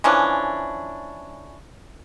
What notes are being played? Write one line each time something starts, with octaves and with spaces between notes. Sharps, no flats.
E3 F3 C#4 D4